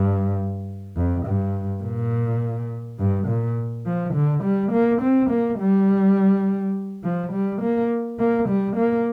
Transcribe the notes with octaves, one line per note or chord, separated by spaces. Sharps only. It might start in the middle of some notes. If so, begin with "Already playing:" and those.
Already playing: G2
F2
G2
A#2
G2
A#2
F3
D3
G3
A#3
C4
A#3
G3
F3
G3
A#3
A#3
G3
A#3